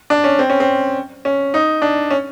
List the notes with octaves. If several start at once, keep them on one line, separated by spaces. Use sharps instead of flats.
D4
C#4
C4
C#4
C4
C#4
D#4
D4
C#4